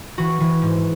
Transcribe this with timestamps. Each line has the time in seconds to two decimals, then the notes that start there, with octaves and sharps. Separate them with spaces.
0.18 E3 F#4
0.40 E3
0.62 G#2